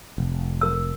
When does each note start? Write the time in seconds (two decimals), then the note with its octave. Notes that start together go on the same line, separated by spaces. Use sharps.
0.18 F1
0.61 A#4 E6